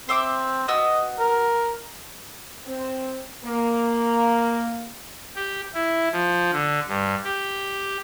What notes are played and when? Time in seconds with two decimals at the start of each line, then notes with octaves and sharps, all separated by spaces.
0.09 C4 C5 E5 D6
0.68 B3 F#4 D#5 E6
1.19 A#4
2.66 C4
3.45 A#3
5.36 G4
5.74 E4
6.12 F3
6.52 D3
6.88 G2
7.24 G4